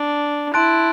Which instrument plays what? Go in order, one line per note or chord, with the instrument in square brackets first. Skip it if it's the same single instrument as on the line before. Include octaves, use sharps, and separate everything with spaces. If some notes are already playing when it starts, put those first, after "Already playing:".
Already playing: [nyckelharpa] D4
[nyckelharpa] E4 [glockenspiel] A5 C6 F#6 A6 D7